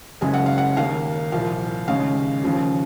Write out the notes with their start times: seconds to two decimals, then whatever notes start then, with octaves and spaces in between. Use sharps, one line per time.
0.21 F#1 F#2 C#3 G#3 G#5
0.34 F#5
0.46 F5
0.58 F#5
0.77 D#2 D#3 A#3 F5
1.32 C2 A#2 F3 F5
1.87 D#2 C#3 G#3 C#4 F5
2.44 D#2 C#3 F3